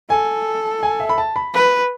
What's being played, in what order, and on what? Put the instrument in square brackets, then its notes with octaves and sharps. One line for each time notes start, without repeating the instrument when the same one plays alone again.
[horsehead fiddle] A4 [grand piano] G#5
[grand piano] G#5
E5
B5
A5
B5
[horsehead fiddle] B4